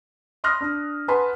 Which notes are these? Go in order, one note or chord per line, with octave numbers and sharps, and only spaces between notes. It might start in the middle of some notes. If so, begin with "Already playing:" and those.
B5 C6 D#6 F6 F#6 A#6
D4
B4 F#5 G#5 A5 B5 C6